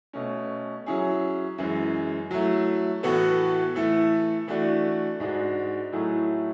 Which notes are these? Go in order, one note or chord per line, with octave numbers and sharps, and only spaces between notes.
B2 A3 C#4
F#3 C#4 E4 G#4
F#2 E3 G#3
F#3 A3 E4
A2 E3 B3 F#4 A4
E3 A3 E4 A4
E3 A3 D4 F#4
G#2 G#3 D4 F#4
A2 F#3 A3 E4 G#4